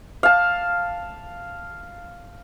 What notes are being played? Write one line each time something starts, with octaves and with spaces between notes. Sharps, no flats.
F5 A5